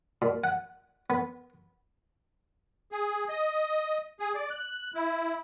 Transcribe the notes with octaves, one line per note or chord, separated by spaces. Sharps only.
A#2
F#5
B3
G#4
D#5
G#4
D5
F#6
E4